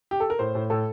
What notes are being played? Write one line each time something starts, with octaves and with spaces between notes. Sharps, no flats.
G4
A4
A#4
A2 C5
A2
A2 A4